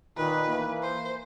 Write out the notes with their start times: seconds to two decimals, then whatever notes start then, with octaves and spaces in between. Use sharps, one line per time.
0.17 A#2 D#3 B4
0.47 E3 A#3
0.83 C5